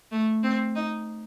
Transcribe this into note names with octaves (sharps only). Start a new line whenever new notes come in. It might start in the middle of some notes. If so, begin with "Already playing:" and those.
A3
C4
D#4